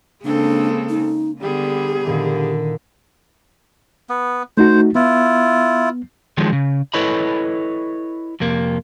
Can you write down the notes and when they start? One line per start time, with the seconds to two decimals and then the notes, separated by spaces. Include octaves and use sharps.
0.25 C#3 G#3 A#3 C4 D4 A4
0.89 D#4
1.41 D3 G3 B3 G4 G#4
2.05 A#2 D3 D#3 E4
4.09 B3
4.57 A3 D#4 F#4 C5
4.95 B3 E4 F4
6.37 D3 D#3 F3 F#3 G#3
6.53 C#3
6.94 E4 A4 B4 C#5 D#5 B5
8.40 F2 C3 A#3